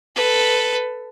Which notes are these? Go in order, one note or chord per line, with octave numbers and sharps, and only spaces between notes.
A4 B4